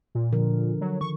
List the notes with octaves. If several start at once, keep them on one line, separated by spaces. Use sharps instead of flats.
A#2
D3 F3 A#4
F#3
D#3 C#6